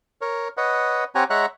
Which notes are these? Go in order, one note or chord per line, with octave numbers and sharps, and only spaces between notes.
A#4 C#5
B4 C#5 D#5 F#5
C4 G4 C#5 F#5 G#5 A#5
G#3 C#5 E5 F#5 A#5 F#6